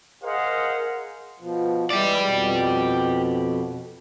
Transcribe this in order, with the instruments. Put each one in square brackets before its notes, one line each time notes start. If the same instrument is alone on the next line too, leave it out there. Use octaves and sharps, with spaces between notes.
[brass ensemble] G#4 A#4 C5 D#5 F5 F#5
[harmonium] B2 F3
[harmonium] E3 G#3 E4 [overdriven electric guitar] G4 D5
[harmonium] F2 B2